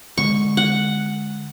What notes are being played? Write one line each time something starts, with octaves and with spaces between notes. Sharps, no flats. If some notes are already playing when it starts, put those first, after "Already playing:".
D3 G#3 C#6
F#5